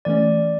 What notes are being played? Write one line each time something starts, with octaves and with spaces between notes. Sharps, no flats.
E3 A3 C#4 D5